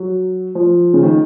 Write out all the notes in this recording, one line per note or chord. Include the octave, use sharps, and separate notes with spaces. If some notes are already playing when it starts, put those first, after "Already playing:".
Already playing: F#3
F3
C#3
D#3